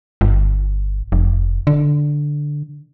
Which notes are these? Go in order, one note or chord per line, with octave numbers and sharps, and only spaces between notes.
G1
F1
D3